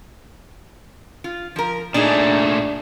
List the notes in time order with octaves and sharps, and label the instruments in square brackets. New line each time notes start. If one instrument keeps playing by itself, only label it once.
[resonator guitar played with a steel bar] F4
F3 A#4
[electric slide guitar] A#2 A3 [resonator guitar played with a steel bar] D4 D#4 G#4